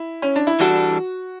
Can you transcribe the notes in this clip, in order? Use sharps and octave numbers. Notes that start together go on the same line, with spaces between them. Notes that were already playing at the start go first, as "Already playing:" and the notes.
Already playing: E4
C#4
D4
E4
E3 G3 D4 F#4 A4